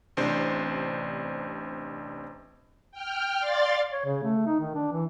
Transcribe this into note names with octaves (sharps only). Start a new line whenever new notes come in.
A1 C3 D4 C5
G5 F6
D5 F5 C6 A6
C#5
C#3
A3
D#4
D#3
D4
E3